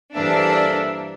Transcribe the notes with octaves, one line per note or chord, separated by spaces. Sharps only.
G2 E3 A#3 D4 A4 C5 E5